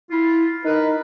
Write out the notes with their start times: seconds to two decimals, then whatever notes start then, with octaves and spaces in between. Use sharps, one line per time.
0.11 E4 F4
0.65 D#4 A#4 B4